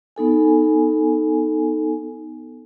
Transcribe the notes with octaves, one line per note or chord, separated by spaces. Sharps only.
B3 D#4 A4 G#5